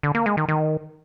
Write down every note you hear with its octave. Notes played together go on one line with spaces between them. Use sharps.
D3
A#3
G#3
D#3
D#3